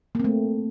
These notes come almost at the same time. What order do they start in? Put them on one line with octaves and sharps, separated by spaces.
A#3 C4 A3